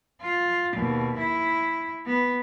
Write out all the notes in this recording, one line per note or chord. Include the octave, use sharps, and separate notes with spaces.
F4
D#2 B2
E4
B3